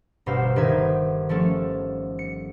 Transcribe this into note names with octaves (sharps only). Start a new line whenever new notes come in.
G1 B2 C5 F5 E6
G1 D#3 D#4 C5 E5 G#6
F3 A3 C#4 A4
C#7